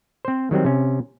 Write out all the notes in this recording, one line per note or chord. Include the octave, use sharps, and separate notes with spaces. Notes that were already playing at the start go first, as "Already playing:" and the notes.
C4 C5
D#3 F#3 G3 C4
C3 C#4